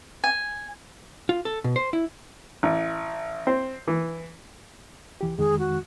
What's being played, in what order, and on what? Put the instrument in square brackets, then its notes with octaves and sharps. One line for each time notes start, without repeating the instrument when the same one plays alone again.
[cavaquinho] G#5
[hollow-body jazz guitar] F4
A4
B2
C5
E4
[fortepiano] A1
C4
E3
[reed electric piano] C2 E3 G4
[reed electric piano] F2 D#3 G#3 [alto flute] G#4
[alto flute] F#4